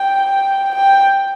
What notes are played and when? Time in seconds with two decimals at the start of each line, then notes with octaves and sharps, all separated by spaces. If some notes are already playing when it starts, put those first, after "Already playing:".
Already playing: G5
0.75 G5